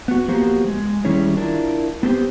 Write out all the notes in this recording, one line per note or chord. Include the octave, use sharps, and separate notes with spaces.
B3 F#4
F3 A#3 B3 F#4 G4 C5
G#3
D#3 G3 C#4 E4 G#4 C#5
D4 E4 F4 A#4
B3 C4 G4 C5